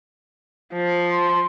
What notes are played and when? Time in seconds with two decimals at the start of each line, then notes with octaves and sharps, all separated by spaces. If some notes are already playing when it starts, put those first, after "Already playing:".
0.73 F3
1.11 C6